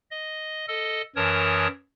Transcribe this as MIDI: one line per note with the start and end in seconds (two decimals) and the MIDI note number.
0.11 0.67 75
0.68 1.02 69
0.68 1.02 75
1.16 1.67 42
1.16 1.67 52
1.16 1.67 70
1.16 1.67 73
1.16 1.67 81
1.16 1.67 87